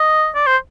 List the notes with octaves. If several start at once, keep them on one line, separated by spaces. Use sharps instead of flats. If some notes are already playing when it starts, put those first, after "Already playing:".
Already playing: D#5
D5
C5